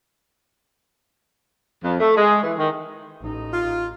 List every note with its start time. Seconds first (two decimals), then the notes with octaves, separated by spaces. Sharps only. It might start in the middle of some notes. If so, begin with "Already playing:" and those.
1.83 F2
2.00 A3
2.17 G#3
2.43 E3
2.59 D#3
3.21 A1 D#4
3.53 F4